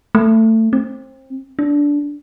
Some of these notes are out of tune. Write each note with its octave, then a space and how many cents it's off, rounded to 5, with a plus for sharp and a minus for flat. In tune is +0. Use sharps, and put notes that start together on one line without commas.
A3 +20
C4 +25
D4 -15